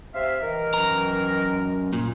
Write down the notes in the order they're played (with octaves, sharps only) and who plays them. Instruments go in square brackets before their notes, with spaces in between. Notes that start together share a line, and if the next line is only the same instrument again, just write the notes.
[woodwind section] C3 E5 F5
D#3 E3 A#4
[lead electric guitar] F#2 A#5
A#2